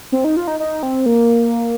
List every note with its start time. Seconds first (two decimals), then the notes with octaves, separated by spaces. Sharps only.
0.12 C4
0.24 D#4
0.37 F4
0.47 D#4
0.60 D#4
0.83 C4
1.06 A#3